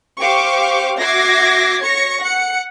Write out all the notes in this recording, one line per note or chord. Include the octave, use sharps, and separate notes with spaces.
G4 C5 F5 C#6 D6
F#4 E5 D6 G#6 A#6 C7
C#5 C#6 A#6 C#7
F#5 C#7